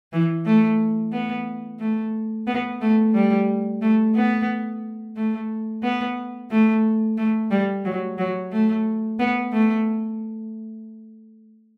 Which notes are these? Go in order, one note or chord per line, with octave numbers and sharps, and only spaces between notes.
E3
A3
B3
A3
B3
A3
G3
A3
B3
A3
B3
A3
A3
G3
F#3
F#3
A3
B3
A3